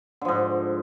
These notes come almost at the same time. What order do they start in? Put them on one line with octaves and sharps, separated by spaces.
D3 F3 G#2